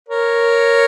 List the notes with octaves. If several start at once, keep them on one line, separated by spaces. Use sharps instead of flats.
A#4 C#5